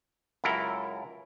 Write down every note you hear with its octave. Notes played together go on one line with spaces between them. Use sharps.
C#2 F#2 E4 A4 A#4